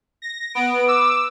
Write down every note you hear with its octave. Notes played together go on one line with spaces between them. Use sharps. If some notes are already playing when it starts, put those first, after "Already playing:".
A#6
B3 D7
D6 E6